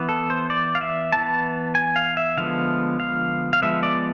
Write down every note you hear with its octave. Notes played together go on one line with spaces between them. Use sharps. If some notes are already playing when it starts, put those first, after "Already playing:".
Already playing: E3 B3
A4
C5
D5
F5
E5
E3 B3 A5
G#5
F5
E5
D3 F3 G#3 B3 F5
F5
F5
F3 G#3 B3 E5
D5